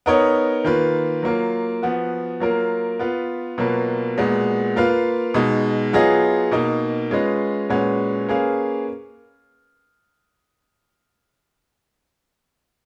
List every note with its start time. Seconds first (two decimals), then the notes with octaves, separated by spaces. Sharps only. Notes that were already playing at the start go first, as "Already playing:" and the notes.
0.06 B3 D#4 A#4 C#5
0.64 D#3 A#3 F4 B4
1.23 F#3 A#3 F4
1.83 F3 B3 F#4
2.40 F#3 A#3 F4 A#4
2.99 B3 F4 B4
3.58 B2 F#3 A#3 F4 B4
4.17 A#2 G#3 B3 F#4
4.76 A#3 F4 B4 F5
5.34 B2 G#3 D#4
5.93 F#3 B3 F4 G#4 D#5
6.52 B2 A#3 D#4
7.11 G#3 C#4 F4 B4 D#5
7.69 A#2 G#3 C#4 F#4 B4
8.29 A#3 C#4 G#4 B4 F5